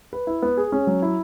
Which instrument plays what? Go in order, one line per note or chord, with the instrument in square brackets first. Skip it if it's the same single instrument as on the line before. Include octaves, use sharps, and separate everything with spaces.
[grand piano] B4
E4
B3
G#4
C#4
F#3
E4